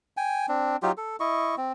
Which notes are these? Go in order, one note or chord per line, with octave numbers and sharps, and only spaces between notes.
G5 G#5
C4 D4
F#3 D#4 F4 G4
A4
E4 D#5 C#6
C4